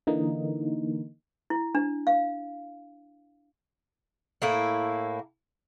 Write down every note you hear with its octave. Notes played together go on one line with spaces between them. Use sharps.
D3 E3 A#3 D#4
E4
D4
F5
A2 A#3 E4